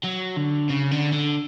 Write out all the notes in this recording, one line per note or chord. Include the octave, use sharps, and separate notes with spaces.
F#3
D3
C#3
D3
D3